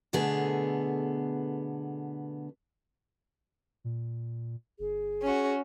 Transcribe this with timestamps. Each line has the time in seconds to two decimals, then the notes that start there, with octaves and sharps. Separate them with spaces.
0.13 B2 D3 A3 B3 G#4
3.84 A#2
4.79 G1 G#4
5.21 C#4 F#4